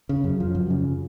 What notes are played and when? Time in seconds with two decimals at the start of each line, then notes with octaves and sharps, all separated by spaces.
0.09 C#3
0.24 F#2
0.40 F3
0.55 F#2
0.70 C#3